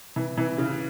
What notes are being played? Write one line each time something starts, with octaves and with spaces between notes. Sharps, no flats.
E3
E3
C#3